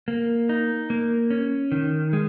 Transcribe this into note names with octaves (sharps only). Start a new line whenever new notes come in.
A#3
D#4
A#3
C#4
D#3
G#3